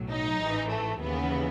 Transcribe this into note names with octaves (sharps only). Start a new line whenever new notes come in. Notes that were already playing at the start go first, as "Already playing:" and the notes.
Already playing: B1 A2 F#3
D#4
A1 G#2 E3
A3
D#2 C#3 E3 B3